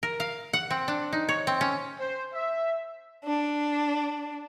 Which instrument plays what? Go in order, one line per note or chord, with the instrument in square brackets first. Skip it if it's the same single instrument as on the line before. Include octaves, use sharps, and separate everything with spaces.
[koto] A#4
F5
F#5
C4
D4
D#4
C#5
C4
C#4
[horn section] C5
E5
[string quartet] D4